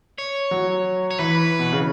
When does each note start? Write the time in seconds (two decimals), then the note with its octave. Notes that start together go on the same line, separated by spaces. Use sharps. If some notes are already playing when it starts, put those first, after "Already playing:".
0.18 C#5
0.51 F#3
1.11 C#5
1.19 E3 B4
1.59 B2
1.73 C#3